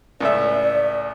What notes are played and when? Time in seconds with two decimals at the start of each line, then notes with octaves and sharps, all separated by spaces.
0.20 C#2 A2 D5 E5